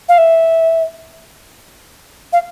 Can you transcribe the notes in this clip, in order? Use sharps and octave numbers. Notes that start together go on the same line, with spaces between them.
F5
E5
F5